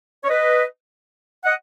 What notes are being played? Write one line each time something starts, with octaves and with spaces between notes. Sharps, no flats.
C#5
B4 D#5
D#5 F#5